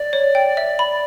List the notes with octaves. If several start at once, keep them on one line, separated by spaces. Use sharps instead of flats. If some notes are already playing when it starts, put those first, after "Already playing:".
Already playing: D5
C#5
G5
E5
B5